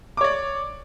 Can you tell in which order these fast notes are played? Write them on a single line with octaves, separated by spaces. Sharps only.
D6 C#5 D5